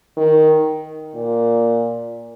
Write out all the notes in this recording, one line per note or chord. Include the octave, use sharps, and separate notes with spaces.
D#3
A#2